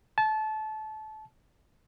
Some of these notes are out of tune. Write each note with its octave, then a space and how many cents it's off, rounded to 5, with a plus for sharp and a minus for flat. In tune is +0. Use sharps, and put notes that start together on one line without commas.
A5 -25